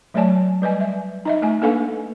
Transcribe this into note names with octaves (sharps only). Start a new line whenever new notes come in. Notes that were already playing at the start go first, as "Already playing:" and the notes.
F#3 A3 C#5 D5 G#5 A5
G3 B4 D#5 G#5
E5
D#4 D#5 E5
A3 G#5
A#3 D4 A4 B4 F5 G#5